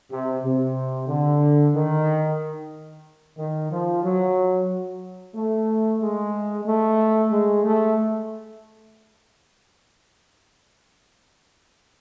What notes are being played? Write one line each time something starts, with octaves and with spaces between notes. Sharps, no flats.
C3
C3
D3
D#3
D#3
F3
F#3
A3
G#3
A3
G#3
A3